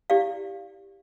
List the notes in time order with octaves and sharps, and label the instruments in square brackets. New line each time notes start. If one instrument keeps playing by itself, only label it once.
[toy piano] E4 G4 D5 F5